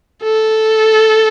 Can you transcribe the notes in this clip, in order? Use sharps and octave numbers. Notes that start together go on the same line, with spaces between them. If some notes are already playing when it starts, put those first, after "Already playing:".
A4